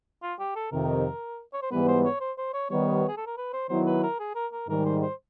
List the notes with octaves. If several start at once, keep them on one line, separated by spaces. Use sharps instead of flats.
F4
G4
A4
F2 C3 D#3 A#4
C#5
C5
G#2 E3 G3 B3 B4
C5
C#5
C5
C5
C#5
D#3 G3 B3 C#5
G#4
A4
A#4
B4
C5
D#3 F#3 B3 E4 C5
B4
A#4
G#4
A#4
A#4
G#2 D#3 G3 A#4
C5
C5